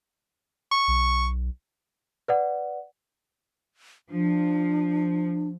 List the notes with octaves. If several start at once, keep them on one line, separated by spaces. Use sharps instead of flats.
C#6
B1
B4 D5 F#5
F3 D4